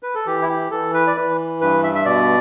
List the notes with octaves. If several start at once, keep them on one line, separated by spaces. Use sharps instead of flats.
B4
A4
E3 G4
E4
G4
E3 A4
B4
D5
E3 B4
G2 B4
E5
E5
B2 D5